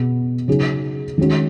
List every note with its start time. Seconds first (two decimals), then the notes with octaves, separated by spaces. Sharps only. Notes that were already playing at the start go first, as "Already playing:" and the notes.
Already playing: B2 B3 G#4
0.48 C#3 F#3 D#4 G#4
1.18 D#3 G#3 C#4 F#4